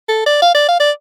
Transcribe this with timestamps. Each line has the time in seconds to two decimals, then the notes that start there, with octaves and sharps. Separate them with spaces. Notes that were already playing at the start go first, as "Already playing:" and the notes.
0.08 A4
0.26 D5
0.42 F5
0.55 D5
0.69 F5
0.80 D5